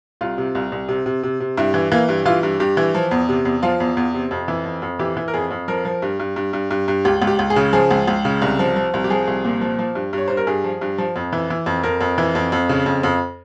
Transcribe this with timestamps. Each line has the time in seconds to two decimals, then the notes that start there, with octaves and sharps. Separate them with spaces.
0.21 C2 F4
0.38 C3
0.55 C2
0.72 C2
0.89 C3
1.06 C3
1.23 C3
1.40 C3
1.57 G2 E4
1.74 E3
1.92 E3 A#3
2.09 G2
2.25 E3 F4
2.43 G2
2.60 G2 G4
2.77 E3
2.95 F3
3.11 E2
3.29 C3
3.45 E2
3.63 F3 F4
3.80 E2
3.97 E2
4.14 C3
4.31 F2
4.48 E3
4.65 F2
4.82 F2
4.99 E3 G4
5.17 E3
5.28 A#4
5.34 F2 G#4
5.51 F2
5.68 F3 A#4
5.85 F3
6.02 G2
6.20 G2
6.36 G2
6.53 G2
6.71 G2
6.88 G2
7.05 C#2 G4
7.22 C#2
7.27 G4
7.39 C#2
7.50 G#4
7.56 C#3
7.73 F3 G#4
7.91 C#2
8.08 C#2
8.25 C#3
8.42 C2
8.59 F3
8.76 F3
8.94 C2
9.04 G4
9.10 F3 G#4
9.27 C2
9.44 A#2
9.61 F3
9.79 F3
9.95 G2
10.13 G2 C#5
10.28 G2 C5
10.37 A#4
10.47 G2 G#4
10.64 F3
10.81 G2
10.98 F3
11.16 F2
11.33 E3
11.50 E3
11.66 F2
11.83 F2 A#4
12.01 F2
12.18 E3
12.35 F2
12.52 F2
12.69 C#3
12.86 F2
13.03 F2